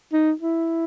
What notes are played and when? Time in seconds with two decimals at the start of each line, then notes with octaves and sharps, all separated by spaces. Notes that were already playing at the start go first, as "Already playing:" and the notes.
0.13 D#4
0.41 E4